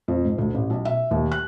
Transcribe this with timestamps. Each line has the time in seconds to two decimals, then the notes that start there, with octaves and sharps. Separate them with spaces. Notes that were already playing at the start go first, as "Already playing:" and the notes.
0.08 F2
0.25 G#2
0.38 D2
0.54 A1
0.70 B1
0.85 E5
1.11 D#2
1.32 F#6